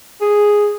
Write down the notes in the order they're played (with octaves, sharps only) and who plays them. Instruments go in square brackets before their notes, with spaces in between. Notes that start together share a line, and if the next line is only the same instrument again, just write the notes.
[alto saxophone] G#4